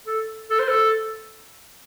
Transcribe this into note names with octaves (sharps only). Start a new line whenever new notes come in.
A4
A4
C5
A4